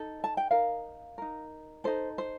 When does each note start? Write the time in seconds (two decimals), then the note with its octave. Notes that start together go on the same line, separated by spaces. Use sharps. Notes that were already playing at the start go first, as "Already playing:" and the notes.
Already playing: D#4 A4
0.24 A5
0.37 G5
0.51 D#4 A#4 F5
1.18 D#4 A#4
1.84 D#4 A4 C5
2.18 C5